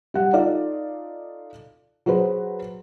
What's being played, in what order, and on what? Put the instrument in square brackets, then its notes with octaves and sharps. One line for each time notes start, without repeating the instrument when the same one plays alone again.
[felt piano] G3 F#5
D#4 F4 A4 D5 D#5 F5
F#3 F#4 G#4 B4 C5